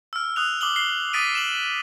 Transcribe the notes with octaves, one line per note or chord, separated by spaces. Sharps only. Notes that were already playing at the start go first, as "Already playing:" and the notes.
E6 F6
D#6 F#6 F7
D6 D#6 F#7 G7
C7 G7
D#6 A6 B6 D7 D#7
E7 F#7